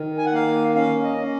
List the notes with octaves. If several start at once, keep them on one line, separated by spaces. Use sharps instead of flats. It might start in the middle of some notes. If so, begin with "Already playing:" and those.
Already playing: D#3
G#5
F#5
A#3 F5
C#4 F5
D#5
C#4